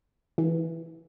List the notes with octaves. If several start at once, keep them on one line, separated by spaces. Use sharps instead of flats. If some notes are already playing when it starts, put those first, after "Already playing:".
E3